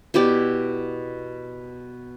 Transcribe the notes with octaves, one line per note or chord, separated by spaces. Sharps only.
B2 E4 G4 D5